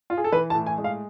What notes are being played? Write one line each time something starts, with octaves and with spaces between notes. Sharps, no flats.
F4
G#4
A4
E3 B4
A5
A2
G#5
G#3
F5